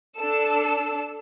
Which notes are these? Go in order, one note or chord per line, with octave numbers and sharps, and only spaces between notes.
D4 A4 E6